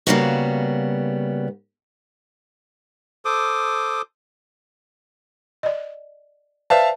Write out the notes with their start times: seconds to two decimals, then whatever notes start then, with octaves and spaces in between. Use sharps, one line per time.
0.07 C#3 F#3 G3 A#3 B3 F#4
3.25 A4 C5 D6 D#6
5.63 D5 D#5
6.70 B4 C5 D5 E5 F5 A5